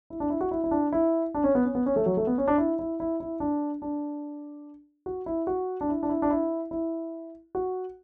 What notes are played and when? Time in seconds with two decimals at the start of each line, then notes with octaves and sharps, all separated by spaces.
0.10 E4
0.20 D4
0.30 E4
0.41 F#4
0.51 E4
0.64 E4
0.71 D4
0.93 E4
1.34 D4
1.44 C#4
1.55 B3
1.65 C#4
1.75 B3
1.86 C#4
1.96 A3
2.06 F#3
2.17 A3
2.27 B3
2.38 C#4
2.48 D4
2.58 E4
2.79 E4
3.00 E4
3.20 E4
3.40 D4
3.82 D4
5.06 F#4
5.26 E4
5.47 F#4
5.81 D4
5.89 E4
6.03 D4
6.09 E4
6.22 D4
6.30 E4
6.71 E4
7.55 F#4